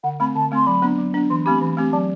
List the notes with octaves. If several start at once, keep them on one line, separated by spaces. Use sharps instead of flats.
D3 F#5
A3 C4 B5
D3 A5
A3 C4 C6
F#3 B5
B3 D4
F#3
B3 D4
E3 C6
A3 C4 G4 B5
E3
A3 C4 G4
F#3 A5